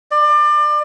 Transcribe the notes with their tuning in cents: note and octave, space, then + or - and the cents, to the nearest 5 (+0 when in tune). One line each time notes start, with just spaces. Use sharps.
D5 +30